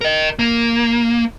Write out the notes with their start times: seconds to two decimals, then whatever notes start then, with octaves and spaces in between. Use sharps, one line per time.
0.01 A#4 D#5
0.39 A#3